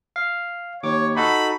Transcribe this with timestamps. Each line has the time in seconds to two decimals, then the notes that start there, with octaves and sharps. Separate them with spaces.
0.16 F5
0.83 D#2 C#5 D6
1.17 D#4 F#4 A4 B5